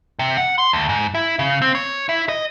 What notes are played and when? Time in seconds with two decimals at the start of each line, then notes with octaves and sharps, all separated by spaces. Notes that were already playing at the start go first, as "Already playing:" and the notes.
0.19 C3
0.37 F#5
0.58 C6
0.73 D2
0.89 G#2
1.14 E4
1.39 C#3
1.62 C4
1.75 C#5
2.09 E4
2.29 D#5